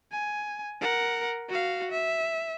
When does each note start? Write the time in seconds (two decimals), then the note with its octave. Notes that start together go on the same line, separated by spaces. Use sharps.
0.12 G#5
0.81 A#4 F#5
1.49 F#4 F5
1.91 E5